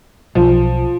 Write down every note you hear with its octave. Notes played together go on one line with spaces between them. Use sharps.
B1 F3